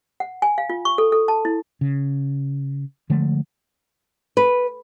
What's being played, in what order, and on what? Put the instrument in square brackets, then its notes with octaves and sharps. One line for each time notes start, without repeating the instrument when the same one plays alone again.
[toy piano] F#5
G#5
F5
F4
C#6
A4
A4
A5
E4
[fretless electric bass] C#3
D3 F3 G#3 A3
[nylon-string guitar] B4